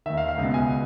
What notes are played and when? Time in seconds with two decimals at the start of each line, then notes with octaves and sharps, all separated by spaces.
0.06 D#3 E5
0.10 D#2
0.17 F5
0.28 F5
0.38 C#2
0.43 B2
0.54 G#5